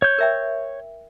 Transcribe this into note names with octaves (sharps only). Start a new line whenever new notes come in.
C#5 G6
A#4 E5 G5